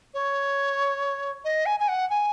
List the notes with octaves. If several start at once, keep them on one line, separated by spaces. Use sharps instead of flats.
C#5
D#5
G#5
G#5
F#5
G#5